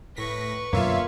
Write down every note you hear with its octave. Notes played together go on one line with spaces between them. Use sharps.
A2 B4 C#6 A#6 B6
F#2 B2 D3 A#3 F4 C#5 E5 F5